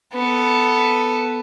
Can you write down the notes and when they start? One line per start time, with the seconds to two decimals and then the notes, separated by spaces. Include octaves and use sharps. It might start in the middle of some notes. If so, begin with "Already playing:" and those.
0.13 B3 A4